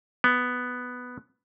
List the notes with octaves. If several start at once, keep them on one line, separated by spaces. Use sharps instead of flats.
B3